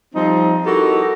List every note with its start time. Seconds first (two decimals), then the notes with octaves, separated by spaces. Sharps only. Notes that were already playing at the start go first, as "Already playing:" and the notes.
0.14 F3 G3 C4 D#4
0.66 D#4 E4 F#4 G4 A4 A#4